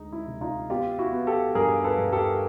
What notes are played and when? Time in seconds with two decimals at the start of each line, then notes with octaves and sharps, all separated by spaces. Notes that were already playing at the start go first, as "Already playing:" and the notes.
Already playing: D2 G#3 D#4
0.12 E4
0.27 C3
0.41 D#4 F4
0.69 B3 F4 G4
0.99 E4 F#4
1.12 B3
1.27 G4 A4
1.55 G2 G#4 A#4
1.84 A4 B4
1.98 G2
2.12 G4 A4